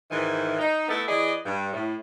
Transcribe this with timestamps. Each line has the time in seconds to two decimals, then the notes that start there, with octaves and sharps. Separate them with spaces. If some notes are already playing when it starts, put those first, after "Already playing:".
0.11 G#2 D#3 E3
0.59 D#4
0.89 A3 B3 E4 A4
1.08 E3 G#4 D5 D#5
1.45 G2
1.73 A2